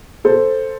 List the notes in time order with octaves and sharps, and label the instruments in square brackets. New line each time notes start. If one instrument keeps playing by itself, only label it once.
[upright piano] B2 A4 C5